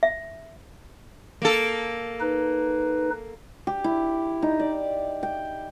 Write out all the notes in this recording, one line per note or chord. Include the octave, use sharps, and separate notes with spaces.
E5
A#3 A4
D#4 B4
G4
E4
D#4
D5
G5